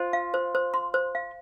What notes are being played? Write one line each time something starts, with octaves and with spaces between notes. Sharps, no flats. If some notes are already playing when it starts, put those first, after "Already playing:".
Already playing: F4 C5
F5
C5
C5
C6
C5
F5